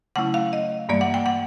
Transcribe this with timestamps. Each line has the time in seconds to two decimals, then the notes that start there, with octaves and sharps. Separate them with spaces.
0.16 C#3 F#3 A3 C#4 E4 F#5
0.34 F5
0.53 D#5
0.89 G2 E3 G3 A#3 D5
1.01 F#5
1.14 G5
1.26 F#5